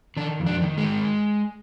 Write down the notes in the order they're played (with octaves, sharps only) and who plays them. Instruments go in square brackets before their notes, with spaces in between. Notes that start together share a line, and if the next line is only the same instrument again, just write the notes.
[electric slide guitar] D#3 D4
F2
D4
D#3
G#3
D#3